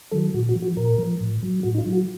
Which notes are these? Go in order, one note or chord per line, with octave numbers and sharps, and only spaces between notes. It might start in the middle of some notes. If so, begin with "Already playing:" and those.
D#3 F#3 A4
A#2 F#4
F#4
F3
F#4
A#2 A#4
F3
A2
F#3
A2 F#4
D#4
F4
F#3
F#4